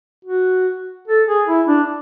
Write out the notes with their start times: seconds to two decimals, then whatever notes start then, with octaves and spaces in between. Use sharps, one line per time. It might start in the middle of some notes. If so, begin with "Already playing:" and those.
0.25 F#4
1.08 A4
1.27 G#4
1.47 E4
1.68 D4